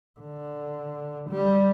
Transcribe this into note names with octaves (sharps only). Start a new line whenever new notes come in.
D3
G3